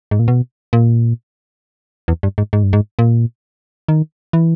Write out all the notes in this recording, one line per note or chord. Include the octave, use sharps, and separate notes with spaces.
G#2
A#2
B2
A#2
E2
G2
G#2
G#2
G2
G#2
A#2
D#3
E3